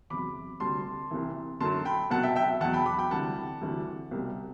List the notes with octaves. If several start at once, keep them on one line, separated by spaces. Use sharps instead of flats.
E2 C3 F#3 B5 D6
D2 C3 G3 A5 C6
C2 C3 E3
F#2 D3 F#3 A5 C6
G5 B5
C2 B2 F#3 F#5 A5
E5 G5
E5 G5
E2 B2 F#3 F#5 A5
G5 B5
B5 D6
G5 B5
D2 C3 E3 G3 F#5 A5
D2 C3 E3 G3
C2 B2 G3